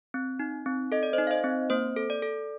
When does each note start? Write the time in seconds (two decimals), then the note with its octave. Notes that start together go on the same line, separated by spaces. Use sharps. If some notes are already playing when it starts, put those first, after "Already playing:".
0.14 C4
0.40 D#4
0.66 C4
0.92 A4 D#5
1.03 D5
1.13 D#4 C5 D#5
1.27 F5
1.31 C5 D#5
1.44 C4
1.70 A#3 C5
1.96 A4
2.10 D5
2.22 A4